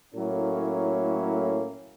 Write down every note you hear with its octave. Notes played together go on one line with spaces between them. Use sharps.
A2 F#3 A3 A#3 C#4 E4